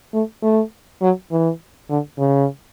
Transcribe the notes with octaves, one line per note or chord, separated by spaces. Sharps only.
A3
A3
F#3
E3
D3
C#3